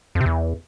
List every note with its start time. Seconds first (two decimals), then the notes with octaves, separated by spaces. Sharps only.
0.15 F2
0.21 C3
0.26 E2